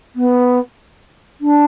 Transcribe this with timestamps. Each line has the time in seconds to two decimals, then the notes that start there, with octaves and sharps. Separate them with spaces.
0.15 B3
1.41 D4